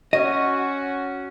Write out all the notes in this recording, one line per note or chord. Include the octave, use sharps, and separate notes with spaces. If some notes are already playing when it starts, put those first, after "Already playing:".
C#4 F#4 D#5